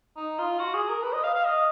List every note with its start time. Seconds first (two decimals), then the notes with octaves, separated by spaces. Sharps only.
0.17 D#4
0.39 F4
0.59 F#4
0.74 G#4
0.89 A#4
1.03 B4
1.13 D#5
1.24 F5
1.34 F5
1.45 D#5